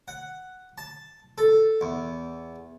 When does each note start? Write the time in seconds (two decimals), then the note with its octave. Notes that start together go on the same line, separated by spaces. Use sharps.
0.08 F#5
0.78 A5
1.38 A4
1.81 E2